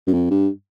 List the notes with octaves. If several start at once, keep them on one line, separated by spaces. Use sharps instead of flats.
F#2
F2
G2